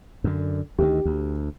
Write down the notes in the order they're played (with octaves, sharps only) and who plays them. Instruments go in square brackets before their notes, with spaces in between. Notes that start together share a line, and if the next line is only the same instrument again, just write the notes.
[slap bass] F#2 D3
[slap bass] D2 D#3 [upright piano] G4
[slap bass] D2